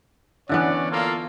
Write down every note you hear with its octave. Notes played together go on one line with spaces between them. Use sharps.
D3 E3 B3 C#4 C#5 D5
A#3 F4 A4